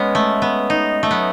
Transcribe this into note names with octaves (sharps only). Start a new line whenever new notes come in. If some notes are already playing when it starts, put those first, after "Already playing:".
Already playing: G#3 B3 C#4
A3
B3
G#3 D#4
A3
F#3 B3